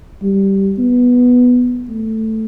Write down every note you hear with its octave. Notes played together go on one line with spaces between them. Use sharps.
G3
B3
A3